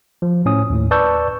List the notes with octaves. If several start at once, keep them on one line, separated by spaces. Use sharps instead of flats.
F3
A2 C#4 D#6
D#2 A2
B4 D5 A5 C#6 E6 G6